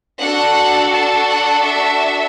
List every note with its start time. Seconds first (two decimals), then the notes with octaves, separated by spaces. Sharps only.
0.20 D4 F#4 A4 F#5
0.93 A5
1.29 F#5
1.65 E5